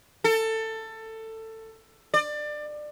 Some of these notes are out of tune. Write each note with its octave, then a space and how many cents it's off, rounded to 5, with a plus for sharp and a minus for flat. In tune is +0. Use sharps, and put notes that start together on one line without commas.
A4 +20
D5 +25